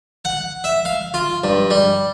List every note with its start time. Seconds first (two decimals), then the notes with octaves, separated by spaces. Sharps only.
0.25 F#5
0.64 E5
0.85 F5
1.14 F4
1.44 G2
1.70 G3